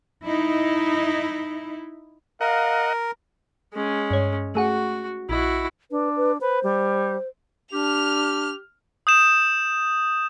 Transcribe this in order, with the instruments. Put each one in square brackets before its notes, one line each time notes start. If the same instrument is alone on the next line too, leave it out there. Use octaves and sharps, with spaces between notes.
[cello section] D#4 E4
[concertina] A#4 [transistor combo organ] D#5 F#5 [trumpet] F5
[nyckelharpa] G#3 C#4
[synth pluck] G2 C#5
[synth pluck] A3 G#4 F#5 [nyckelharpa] F#4
[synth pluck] A#1 D#5 [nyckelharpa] E4 F#4
[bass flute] D4 [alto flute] B4
[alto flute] B4
[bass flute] B4 [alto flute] C5
[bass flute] G3
[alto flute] D4 [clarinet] G4 [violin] F6 F7
[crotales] D#6 G6 E7